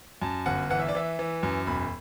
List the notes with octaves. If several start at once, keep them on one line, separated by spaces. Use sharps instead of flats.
F#2 A5
G1 F#5
E3 F#5
E5
D5
E3 E5
E3
F#2
E1 B5